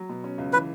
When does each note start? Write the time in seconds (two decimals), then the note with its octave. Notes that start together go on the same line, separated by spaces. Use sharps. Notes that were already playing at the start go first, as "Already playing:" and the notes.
Already playing: F#3
0.09 B2
0.24 C#4
0.38 C#2
0.53 E3 B4